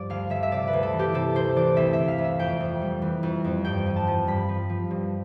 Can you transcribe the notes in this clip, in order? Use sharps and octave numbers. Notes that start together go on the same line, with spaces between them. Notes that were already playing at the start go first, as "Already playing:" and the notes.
Already playing: G2 F3 D5
D2 F5
D2 E5
E5
C3 D5
B4
D2
A4
E3
G4
C3 A4
D2 C5
E3 D5
D2 E5
E5
D2
F5
D2
E5
F2 G5
F2
G3
E3
F2
F2
G2 G5
F3
A5
F3
G2 B5
F3
F3
G2